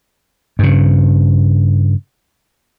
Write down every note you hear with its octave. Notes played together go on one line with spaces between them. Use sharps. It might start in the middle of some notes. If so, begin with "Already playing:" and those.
G2 C#3